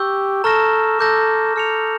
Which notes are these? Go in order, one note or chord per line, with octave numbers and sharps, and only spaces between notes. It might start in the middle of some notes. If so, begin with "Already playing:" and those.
Already playing: G4 C#6 E6 G6
A4 A#5 C#6 F6 A#6 E7
A4 D6 G6 A#6
A4 F6 C#7 F7